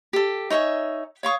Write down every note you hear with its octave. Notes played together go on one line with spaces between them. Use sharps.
G4 A4
D#4 C#5 E5 G#5
C#5 F5 C#6 D#6